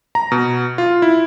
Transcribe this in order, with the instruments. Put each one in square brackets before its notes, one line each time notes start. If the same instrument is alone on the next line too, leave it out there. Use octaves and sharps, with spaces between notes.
[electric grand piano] A#5
B2
F4
E4